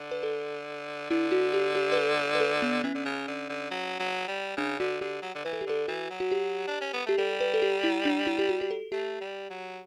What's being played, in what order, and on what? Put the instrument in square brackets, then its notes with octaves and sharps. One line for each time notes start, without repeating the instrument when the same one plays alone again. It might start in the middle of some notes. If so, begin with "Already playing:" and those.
Already playing: [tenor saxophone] D3
[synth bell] B4
A4
[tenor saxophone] D3 [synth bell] E4
[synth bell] F#4
G4
G4
B4
A4
B4
A4
B3
[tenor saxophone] E3 [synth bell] C#4
[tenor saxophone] D3
C#3
D3
D3
F#3
F#3
G3
[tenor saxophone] C#3 [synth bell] D4
[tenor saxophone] D3 [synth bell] F#4
[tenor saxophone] D3 [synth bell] G4
[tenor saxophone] F#3
D3
[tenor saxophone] E3 [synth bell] B4
[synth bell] A4
G4
[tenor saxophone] D3 [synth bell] A4
[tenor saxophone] E3 [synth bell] F#4
[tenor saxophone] F#3
[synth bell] F#4
G4
[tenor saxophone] D4
C#4
B3
[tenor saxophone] A3 [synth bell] G4
[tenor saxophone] G3 [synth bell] A4
[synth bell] B4
A4
G4
E4
D4
E4
G4
F#4
G4
A4
[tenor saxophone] A3 [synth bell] G4
[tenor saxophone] G3
F#3